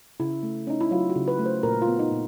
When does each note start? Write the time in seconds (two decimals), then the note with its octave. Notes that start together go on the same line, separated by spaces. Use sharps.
0.20 C#3 E4
0.43 A3
0.67 C#4 D#4
0.81 E4
0.91 F#3 F4
1.09 F#4
1.15 C#3
1.28 B4
1.39 A3
1.46 C5
1.63 A#2 A#4
1.82 F4
1.87 B3
1.99 D#4
2.12 A#2